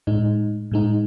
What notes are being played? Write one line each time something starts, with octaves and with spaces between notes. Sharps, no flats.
A2 G#3 D#4
A2 G#3 D#4